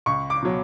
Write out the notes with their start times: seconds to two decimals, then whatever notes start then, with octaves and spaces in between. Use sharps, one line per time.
0.06 C#2 C#6
0.30 D6
0.43 B2 F#3